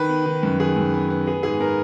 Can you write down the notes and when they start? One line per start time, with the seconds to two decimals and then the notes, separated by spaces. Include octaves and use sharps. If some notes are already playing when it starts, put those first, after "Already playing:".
Already playing: D#3 B4
0.09 B3
0.26 D#3
0.43 F#2
0.60 D#3 G#4
0.76 F#2
0.94 B3
1.10 B3
1.26 B3 G#4
1.43 G#2 G#4
1.60 B3 A#4